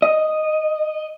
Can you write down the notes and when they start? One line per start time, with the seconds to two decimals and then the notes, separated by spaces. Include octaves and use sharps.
0.02 D#5